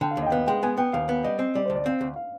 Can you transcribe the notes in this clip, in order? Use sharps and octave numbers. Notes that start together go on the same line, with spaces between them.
D3 G5
F5
D#2
D#5
G5
B3 F5
G#3 G5
B3 G#5
B3 G5
D#2 F5
B3
G3 D#5
C4
G3 D5
C5
D2
D5
C4 F5
D2
F5